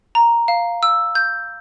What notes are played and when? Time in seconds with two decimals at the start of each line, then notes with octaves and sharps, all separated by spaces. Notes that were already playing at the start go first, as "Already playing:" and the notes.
0.15 A#5
0.48 F5
0.83 E6
1.15 G6